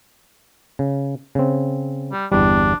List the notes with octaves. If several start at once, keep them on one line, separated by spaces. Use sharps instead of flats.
C#3
C#3 C4
G3
G1 E2 G3 D4